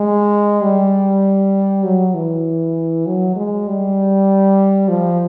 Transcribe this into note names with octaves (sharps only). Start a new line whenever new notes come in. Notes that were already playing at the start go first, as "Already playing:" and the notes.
Already playing: G#3
G3
F#3
E3
F#3
G#3
G3
F3